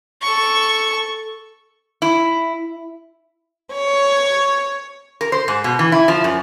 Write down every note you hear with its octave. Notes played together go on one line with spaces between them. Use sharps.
A4 C#6
E4
C#5
A#4
C5
G#2
B2
E3
E4
F3
F#2